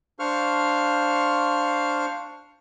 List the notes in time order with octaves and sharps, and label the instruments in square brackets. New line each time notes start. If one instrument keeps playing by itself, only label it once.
[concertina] D4 C5 F5 C#6 F6